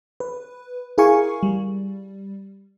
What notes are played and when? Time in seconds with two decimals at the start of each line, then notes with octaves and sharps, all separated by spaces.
0.20 B4
0.98 E4 G#4 A#4 F5 G#5 C#6
1.43 G3